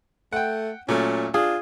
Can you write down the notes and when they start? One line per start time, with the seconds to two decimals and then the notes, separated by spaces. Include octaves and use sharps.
0.33 A3 F#5 G5
0.89 A#2 F#3 A3 C#4
1.34 D4 F4 G#4